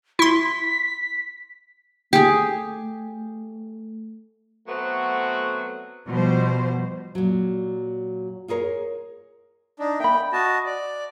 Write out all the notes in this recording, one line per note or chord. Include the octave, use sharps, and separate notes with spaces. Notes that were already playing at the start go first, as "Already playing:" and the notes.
E4 C6 B6
A3 G4 G#4
F#3 A3 B3 C4 F#4
B2 F3 G3 C5
A#2 F#3
F4 G#4 A#4 C5 C#5
D4 D#4
E5 G5 B5
F#4 D#5 A5
D5